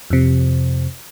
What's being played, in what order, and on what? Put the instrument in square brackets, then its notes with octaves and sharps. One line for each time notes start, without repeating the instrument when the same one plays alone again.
[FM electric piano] F2 C3